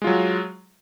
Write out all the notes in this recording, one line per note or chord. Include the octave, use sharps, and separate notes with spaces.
F#3 G#3 F4